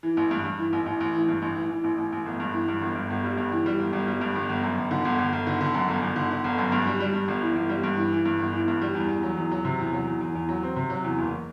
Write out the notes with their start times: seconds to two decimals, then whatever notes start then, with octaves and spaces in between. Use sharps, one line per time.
0.03 E3
0.17 A1
0.31 G2
0.45 G2
0.59 E3
0.73 A1
0.86 A1
1.01 A1
1.15 E3
1.29 G2
1.42 A1
1.56 E3
1.71 E3
1.84 A1
1.98 A1
2.12 A1
2.26 G1
2.40 G2
2.53 E3
2.68 G2
2.81 G1
2.95 G2
3.10 G1
3.24 G3
3.38 G2
3.52 E3
3.66 G3
3.80 G1
3.93 G1
4.07 G3
4.21 G2
4.35 G1
4.49 G1
4.63 F#2
4.78 G1
4.91 D3
5.05 G1
5.18 G1
5.33 G1
5.47 D3
5.61 D3
5.74 F#2
5.88 G1
6.02 G1
6.16 D3
6.31 D3
6.44 G1
6.58 F#2
6.72 G2
6.87 G3
7.00 G3
7.14 G2
7.28 G1
7.42 E3
7.56 G1
7.69 G3
7.84 G2
7.97 E3
8.12 E3
8.25 G2
8.40 G1
8.54 E3
8.68 G2
8.81 G3
8.95 E2
9.09 E2
9.23 F#3
9.37 E2
9.51 F#3
9.65 C3
9.79 E2
9.93 F#3
10.07 E2
10.21 E2
10.35 E2
10.49 F#3
10.63 C4
10.76 C3
10.90 F#3
11.04 E2
11.19 F#1